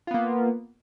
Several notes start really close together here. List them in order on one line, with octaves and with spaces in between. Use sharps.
F4 B3 A#3